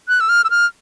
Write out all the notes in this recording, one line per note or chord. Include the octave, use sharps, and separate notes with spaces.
F#6
E6
F6
E6
F6